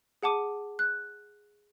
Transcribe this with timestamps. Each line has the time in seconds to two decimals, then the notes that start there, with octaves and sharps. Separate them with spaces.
0.23 G#4 F#5 A5 D6 D#7
0.79 F#6